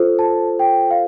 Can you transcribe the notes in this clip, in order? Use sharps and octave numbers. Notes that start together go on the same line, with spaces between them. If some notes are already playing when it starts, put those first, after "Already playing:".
Already playing: F4 A4 C5
A5
G5
F5